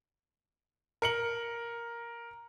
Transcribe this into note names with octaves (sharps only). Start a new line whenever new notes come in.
A#4 C#7 F#7